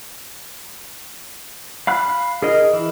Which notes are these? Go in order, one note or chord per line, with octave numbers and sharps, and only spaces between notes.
F5 B5 F#6
G#4 A#4 D#5
E3